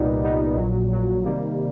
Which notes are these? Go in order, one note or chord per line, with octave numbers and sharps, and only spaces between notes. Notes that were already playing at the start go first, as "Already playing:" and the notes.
Already playing: C2 A#2 G3 B3 D#4
C2 A#2 G3 B3 D#4
A#1 A#2 F#3
A#1 A#2 F#3
C3 D#3 G3 A#3